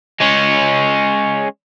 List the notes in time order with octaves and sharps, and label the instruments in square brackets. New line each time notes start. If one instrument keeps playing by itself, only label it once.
[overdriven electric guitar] G#3 C#4